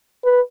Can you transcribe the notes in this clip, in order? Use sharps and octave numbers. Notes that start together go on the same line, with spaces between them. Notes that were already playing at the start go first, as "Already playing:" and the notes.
B4